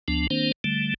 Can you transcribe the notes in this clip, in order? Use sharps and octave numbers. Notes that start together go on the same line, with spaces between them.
D2 F3 B3 D4
D#3 A#3 C4 D4 C5
D3 G3 A3